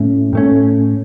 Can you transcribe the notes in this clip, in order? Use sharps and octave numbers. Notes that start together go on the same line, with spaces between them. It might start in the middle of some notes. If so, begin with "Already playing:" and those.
Already playing: A2 A3 C#4
A2 A3 C#4